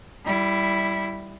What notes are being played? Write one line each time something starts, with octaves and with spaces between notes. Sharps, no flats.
G3 E4